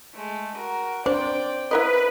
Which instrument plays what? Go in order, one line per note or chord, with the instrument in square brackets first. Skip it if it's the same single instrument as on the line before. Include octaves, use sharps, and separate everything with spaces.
[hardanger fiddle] G#3 A3
F#4 A#4
[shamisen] D4 [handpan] C5 [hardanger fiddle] D5 G5
[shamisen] E4 A#4 D#5 [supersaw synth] B4